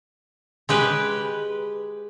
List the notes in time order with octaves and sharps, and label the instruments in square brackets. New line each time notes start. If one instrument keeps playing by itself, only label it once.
[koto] G#3 G4 B4